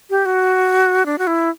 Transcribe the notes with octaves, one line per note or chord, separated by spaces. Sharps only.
G4
F#4
D4
F#4
E4